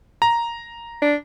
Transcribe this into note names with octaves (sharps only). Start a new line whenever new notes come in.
A#5
D4